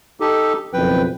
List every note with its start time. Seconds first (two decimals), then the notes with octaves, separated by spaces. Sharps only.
0.20 D#4 G4 A4
0.73 F#1 B1 F2 B4 G5